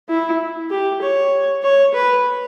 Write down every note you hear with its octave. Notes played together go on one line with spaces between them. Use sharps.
E4
G4
C#5
C#5
B4